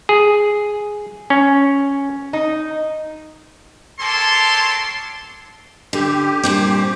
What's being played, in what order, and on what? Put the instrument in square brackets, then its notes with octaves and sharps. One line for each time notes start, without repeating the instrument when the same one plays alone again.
[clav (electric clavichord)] G#4
C#4
[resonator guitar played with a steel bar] D#4
[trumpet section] G4 A4 A#4 C#5 A5 C6
[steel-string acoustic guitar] D3 [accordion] G4
[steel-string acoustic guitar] G2 A#2 C4